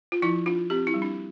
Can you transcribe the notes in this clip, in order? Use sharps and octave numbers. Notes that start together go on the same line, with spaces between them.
F4
F3 E4
D4 F4
C4 G4
E4
G3
D4